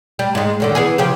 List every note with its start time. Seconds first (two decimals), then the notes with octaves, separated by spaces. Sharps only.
0.19 G3
0.35 G#2 G#3
0.60 F#2 D3 D#3
0.75 E3 B3 G#4
0.98 C#3 F3 G4